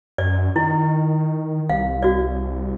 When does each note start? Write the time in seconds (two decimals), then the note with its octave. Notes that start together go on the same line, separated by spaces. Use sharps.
0.18 F#2 D5
0.56 D#3 E4
1.69 C2 F5
2.02 F#4 D5